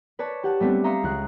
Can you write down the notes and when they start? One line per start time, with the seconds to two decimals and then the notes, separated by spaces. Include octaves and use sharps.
0.19 B4 C#5 D5 A5
0.43 G4 F#5 A5
0.60 G3 A3 B3 C4 D4
0.84 E5 F5 A#5 C6 D#6 C#7
1.03 C#2 F#6